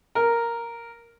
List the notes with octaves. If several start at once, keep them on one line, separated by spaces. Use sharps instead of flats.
A#4